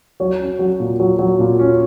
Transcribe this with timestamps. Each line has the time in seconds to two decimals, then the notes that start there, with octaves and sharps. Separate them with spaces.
0.20 F#3 C#5
0.39 C#4
0.59 F#3
0.80 A#2
1.00 F#3
1.19 F#3
1.39 A#2
1.59 C#4